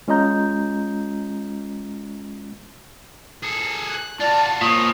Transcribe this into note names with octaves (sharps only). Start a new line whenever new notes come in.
G#3 C#4 F4 D#5 A#5 G6
G#4 A4
F#6
F4 F#4 D5 A5
A#2 F3 C4 C#5 D#6